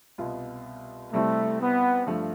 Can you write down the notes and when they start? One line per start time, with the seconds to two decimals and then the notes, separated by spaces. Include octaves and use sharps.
0.18 C2 B2 B3 F4
1.12 C3 G3 A3 C4 E4
1.60 B3
2.07 G2 F3 A3